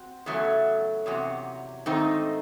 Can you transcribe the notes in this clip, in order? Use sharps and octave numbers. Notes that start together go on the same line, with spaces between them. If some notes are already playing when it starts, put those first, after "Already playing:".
Already playing: C4 F#4
E2 C#3 F#3 A3
E2 C3 F#3 C#4
G#2 D#3 A3 C4 D#4